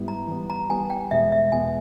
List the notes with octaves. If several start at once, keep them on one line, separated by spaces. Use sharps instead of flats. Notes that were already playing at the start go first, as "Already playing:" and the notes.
Already playing: G#2 G3 B3 E4
A#5
E3 G3 B3
A#5
E3 G3 B3 G#5
G5
E2 B2 G#3 B3 E5
E5
E2 B2 G#3 B3 G#5